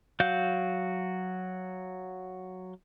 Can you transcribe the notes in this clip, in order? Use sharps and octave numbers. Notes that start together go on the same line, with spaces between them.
F#3 F#4 F5 G6